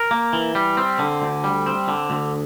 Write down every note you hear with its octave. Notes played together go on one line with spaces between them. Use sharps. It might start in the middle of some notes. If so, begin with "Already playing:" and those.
Already playing: A#4
A#3
E3
G3
C4
D3
D2
G3
C4
D3
D2